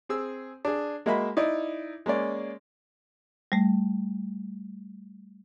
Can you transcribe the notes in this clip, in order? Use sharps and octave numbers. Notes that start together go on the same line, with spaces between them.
C4 G#4 E6
D4 G#4
G#3 A#3 F#4 D#5 E5 B5
D#4 E4 D5 D#5
G#3 A#3 C#4 D5
G3 A3